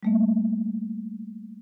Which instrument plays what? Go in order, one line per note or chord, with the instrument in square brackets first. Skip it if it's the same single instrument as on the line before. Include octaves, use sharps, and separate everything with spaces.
[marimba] G3 A3 A#3